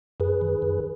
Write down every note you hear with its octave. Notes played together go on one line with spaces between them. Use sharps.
F#2 G#4 B4
D#3
F#2